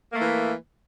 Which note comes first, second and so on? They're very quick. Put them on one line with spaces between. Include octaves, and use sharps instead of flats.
A#3 A3 E3